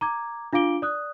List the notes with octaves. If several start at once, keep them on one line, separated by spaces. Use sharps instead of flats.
A#5 D6 G#6
D4 F4 F5 D6 D7 G7
D5 D#6 F#6